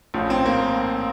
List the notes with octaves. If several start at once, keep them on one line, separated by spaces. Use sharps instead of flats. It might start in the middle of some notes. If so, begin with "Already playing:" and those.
A#1 A2 F3
C4
A#3